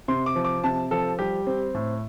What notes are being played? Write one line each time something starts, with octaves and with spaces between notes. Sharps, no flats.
C3 C6
D6
F3
D6
C3 A5
F3 A4
G3 G4
C4
A2